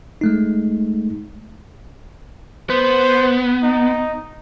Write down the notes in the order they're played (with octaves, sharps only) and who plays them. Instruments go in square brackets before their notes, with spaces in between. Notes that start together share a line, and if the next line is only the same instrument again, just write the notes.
[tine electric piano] G#3 A3 D#4
[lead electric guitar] B3 [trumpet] C5
[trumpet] D#4